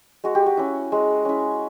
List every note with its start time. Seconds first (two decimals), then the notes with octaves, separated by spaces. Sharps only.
0.24 G#3 F#4
0.35 G4
0.46 F#4
0.57 C#4 E4
0.92 G#3
1.25 C#4 E4